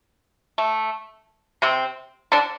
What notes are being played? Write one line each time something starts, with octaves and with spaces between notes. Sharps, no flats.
A3
C3 C4
D3 D4